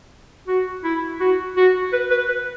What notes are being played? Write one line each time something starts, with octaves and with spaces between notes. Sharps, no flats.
F#4
E4
F#4
F#4
B4
B4
B4